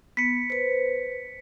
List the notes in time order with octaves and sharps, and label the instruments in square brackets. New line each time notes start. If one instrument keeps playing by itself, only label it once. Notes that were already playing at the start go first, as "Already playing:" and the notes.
[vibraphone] B3 [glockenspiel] B6 C#7
[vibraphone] B4 C5